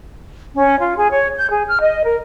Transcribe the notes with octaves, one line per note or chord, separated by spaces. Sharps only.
C#4
F4
G#4
C#5
G6
G#4
F6
D#5
A#4